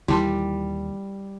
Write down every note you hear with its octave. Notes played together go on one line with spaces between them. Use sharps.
D#2 A#2 E3 G3 E4 A5 C6